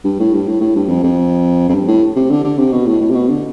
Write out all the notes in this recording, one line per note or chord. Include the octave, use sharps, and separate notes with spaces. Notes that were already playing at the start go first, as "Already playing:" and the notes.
G2
A2
G2
A2
A2
G2
F2
F2
F2
G2
A2
C3
D3
D3
C3
B2
A2
A2
C3
B2
D3